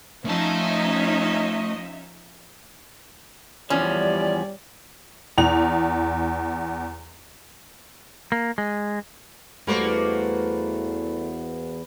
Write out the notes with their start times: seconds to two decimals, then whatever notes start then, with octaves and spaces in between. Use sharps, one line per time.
0.25 F3 A3 C#4 D#4 D#5 E5 A5
3.70 E2 E3 F3 G3 C#4 D5
5.38 E2 F7
8.32 A#3
8.58 G#3
9.67 E2 G3 A3 A#3 F#4 B4 C5